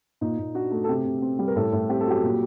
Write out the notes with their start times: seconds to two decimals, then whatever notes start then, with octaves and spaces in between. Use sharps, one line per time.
0.21 A#2 D#4
0.38 A#2
0.55 D4 F#4
0.71 A3
0.84 A4
0.88 C3 G4
1.05 C3
1.22 C4
1.39 G3
1.48 A#4
1.56 A2 A4
1.72 A2
1.89 C4 G4
2.00 A4
2.06 F#3 G4
2.23 A#2